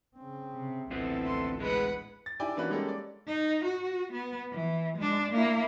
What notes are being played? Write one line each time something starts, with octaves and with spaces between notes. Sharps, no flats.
C#3 C4
C3
A1 D2 B3 C4 E4 F4 A4
C6
G#3 B3 B4 F#5
A6
D4 E4 G4 D5 G5 G#5
E3 A#3 C#4 D4 F#4 B4
G3 G#3 A#3 C#4 G4 A4
D5
D#4
F#4
B3
E3
G#3 D4
A#3 E4